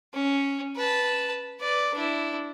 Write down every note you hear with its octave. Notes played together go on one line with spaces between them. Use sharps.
C#4
B4 A5
B4 D5
D4 E4